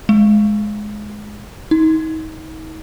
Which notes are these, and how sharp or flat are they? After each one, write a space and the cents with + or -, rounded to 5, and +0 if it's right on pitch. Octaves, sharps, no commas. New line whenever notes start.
G#3 +15
D#4 +35